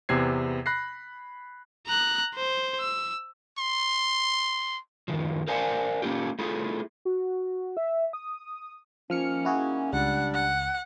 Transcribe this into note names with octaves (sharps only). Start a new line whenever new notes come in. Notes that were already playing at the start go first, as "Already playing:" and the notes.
E2 C3 B3 C4 G#6 C7
B5 F#6 A#6 C7
A#5 F#6
C5
E6
C6
F#2 D#3 F3
A#4 C5 D5 F5 G#5 A5
A#3 C#4 F4 G4
A3 E4 F4 G#4
F#4
E5
D#6
D#3 F3 A#3 C#4 F6 C#7
E4 F#4 G#4
C#2 G3 D4 F#5
F#5